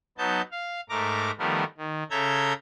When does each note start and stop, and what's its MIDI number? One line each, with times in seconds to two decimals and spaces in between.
0.18 0.42 54
0.18 0.42 59
0.18 0.42 63
0.18 0.42 81
0.18 0.42 91
0.51 0.81 77
0.89 1.31 44
0.89 1.31 57
0.89 1.31 70
0.89 1.31 82
0.89 1.31 86
1.39 1.64 51
1.39 1.64 53
1.39 1.64 55
1.39 1.64 57
1.39 1.64 59
1.39 1.64 70
1.78 2.03 51
2.10 2.53 49
2.10 2.53 69
2.10 2.53 76
2.10 2.53 82
2.10 2.53 91
2.10 2.53 92